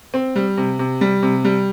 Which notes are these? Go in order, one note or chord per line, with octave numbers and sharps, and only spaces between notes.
C4
G3
C3
C3
G3
C3
G3